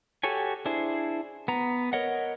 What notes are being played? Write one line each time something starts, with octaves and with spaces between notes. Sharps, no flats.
F#4 G4 A4 C#5 G#5
D4 E4 G#4 C5
B3 A#5
A#4 C#5 D#5 F#5